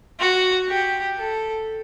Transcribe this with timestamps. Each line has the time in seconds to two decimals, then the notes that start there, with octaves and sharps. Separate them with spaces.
0.19 F#4
0.68 G4
1.17 A4